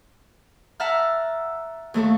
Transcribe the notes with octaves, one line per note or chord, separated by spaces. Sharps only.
E5 F#5 A5 A#5 E6 F6
D#2 A3 A4 C#6